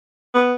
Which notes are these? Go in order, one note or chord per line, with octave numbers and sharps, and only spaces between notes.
B3